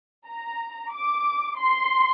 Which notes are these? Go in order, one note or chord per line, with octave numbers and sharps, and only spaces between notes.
A#5
D6
C6